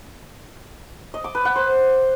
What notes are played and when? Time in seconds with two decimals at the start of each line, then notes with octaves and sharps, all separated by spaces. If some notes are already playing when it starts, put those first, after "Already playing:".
1.14 D#5
1.24 D6
1.35 B4
1.45 F#5
1.56 C5